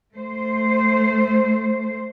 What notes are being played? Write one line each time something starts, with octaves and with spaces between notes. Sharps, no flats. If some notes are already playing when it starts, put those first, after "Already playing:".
A3 C5